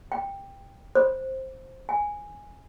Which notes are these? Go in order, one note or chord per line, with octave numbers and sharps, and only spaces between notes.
G5
C5
G#5